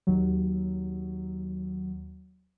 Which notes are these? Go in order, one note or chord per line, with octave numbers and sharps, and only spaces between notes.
D#2 F#3